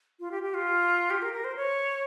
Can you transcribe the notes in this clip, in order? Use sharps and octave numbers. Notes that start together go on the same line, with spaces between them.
F4
G4
G4
F4
G4
A#4
A#4
C5
C#5